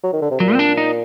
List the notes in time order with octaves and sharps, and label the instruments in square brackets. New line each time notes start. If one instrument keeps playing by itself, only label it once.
[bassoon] F#3
D#3
D3
C3
[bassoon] A#2 [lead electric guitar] F#3
[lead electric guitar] C4
D4
D#4